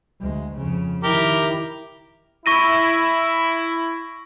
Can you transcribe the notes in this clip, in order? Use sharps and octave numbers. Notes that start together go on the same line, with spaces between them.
D2 G#3
F2 C#3
D#3 E4 G4 A#4
E4 C#6 A#6 D#7